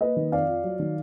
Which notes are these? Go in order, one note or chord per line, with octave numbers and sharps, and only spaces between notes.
A#3 B4 D#5
D#3
F2 D5 F5
F4
F#3
D#3